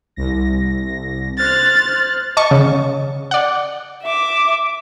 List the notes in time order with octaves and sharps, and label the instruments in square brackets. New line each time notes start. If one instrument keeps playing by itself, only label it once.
[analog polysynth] C2 A#6
[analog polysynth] C5 F6 F#6 [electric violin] A6
[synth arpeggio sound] D#5 A5 C#6
C#3
D5 F#5
[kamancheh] E5 D6